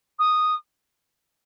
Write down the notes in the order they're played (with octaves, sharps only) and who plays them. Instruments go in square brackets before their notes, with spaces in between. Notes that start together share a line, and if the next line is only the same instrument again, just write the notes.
[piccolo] D#6